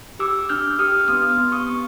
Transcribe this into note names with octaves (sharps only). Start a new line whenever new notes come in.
G4 D6 E6
D4 F6 G6
G4 D#6 F6
B3 D#6 F6
B3
C#6 D#6
B3